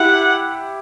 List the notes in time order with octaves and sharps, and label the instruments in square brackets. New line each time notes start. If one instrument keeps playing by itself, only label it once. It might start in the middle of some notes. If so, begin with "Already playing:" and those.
Already playing: [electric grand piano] E4 G4 [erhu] F#5